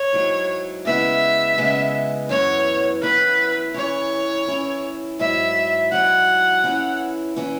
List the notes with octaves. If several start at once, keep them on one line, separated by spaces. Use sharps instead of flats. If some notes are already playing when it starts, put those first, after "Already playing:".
Already playing: C#5
G#2 F#3 E4
C#3 G#3 B3 E4 E5
C#3 G#3 B3 E4
F#2 E3 B3 E4 C#5
F#2 E3 B3 E4 B4
E3 C#4 E4 C#5
E3 C#4 E4
G#2 F#3 E4 E5
G#2 F#3 E4 F#5
E3 C#4 E4
E3 C#4 E4